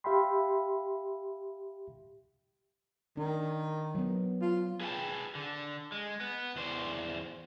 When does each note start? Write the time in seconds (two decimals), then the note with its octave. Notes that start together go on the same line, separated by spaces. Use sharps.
0.04 G4 E5 F5 G5 B5 C6
3.17 D#3 D4
3.95 F#3 B3
4.41 F4
4.81 G#4 B4 E5 F#5 G5 A5
5.35 D3
5.92 G#3
6.21 B3
6.56 E2 C5 D5